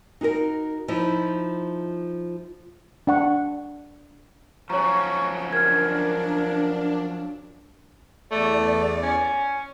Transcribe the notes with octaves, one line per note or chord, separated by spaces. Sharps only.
D#4 F#4 G#4 A#4
F3 D#4 E4
D4 F#5 C#6
F3 F#3 C#4 C#5 A#5 C#6
D4 A#4 F6 G#6
E2 A3 D5
C#4